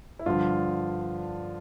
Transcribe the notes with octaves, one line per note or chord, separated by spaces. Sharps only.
E4
G2 D3 F3 F4